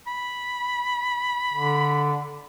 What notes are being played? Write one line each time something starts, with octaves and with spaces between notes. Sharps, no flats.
B5
D3